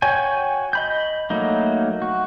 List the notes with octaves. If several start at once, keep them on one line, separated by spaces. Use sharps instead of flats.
F#4 C#5 G5 G#5
D#5 B5 G6
F#3 A3 A#3 D#4
F#4